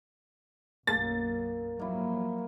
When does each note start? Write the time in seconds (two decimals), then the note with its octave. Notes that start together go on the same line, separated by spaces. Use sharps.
0.87 B1 F#2 F#3 A#3 A6
1.79 G#2 F3 F#3 A#3 E4